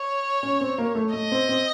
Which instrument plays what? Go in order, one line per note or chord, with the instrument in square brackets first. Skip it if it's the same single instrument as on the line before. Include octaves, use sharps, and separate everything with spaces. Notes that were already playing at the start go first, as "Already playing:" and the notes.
Already playing: [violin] C#5
[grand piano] C#4
C4
A#3
A3
[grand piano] A3 [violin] D#5
[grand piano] C4
C4